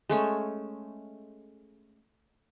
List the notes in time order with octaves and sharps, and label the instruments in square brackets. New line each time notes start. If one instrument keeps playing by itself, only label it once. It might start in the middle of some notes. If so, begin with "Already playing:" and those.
[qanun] G#3 A3 C#4